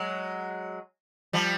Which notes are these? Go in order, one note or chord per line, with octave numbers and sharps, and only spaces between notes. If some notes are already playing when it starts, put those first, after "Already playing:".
Already playing: F#3 G#3
F3 G3